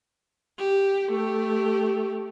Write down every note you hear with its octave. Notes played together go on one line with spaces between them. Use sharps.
G4
A3 G4